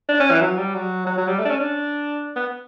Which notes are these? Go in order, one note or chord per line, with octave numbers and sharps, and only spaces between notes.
D4
C#4
E3
F#3
G3
F#3
F#3
F#3
G3
A3
D4
C#4
D4
B3